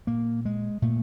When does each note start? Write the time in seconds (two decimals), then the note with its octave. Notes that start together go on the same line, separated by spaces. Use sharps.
0.07 A#2 A#3
0.45 G#3
0.82 A#2 A3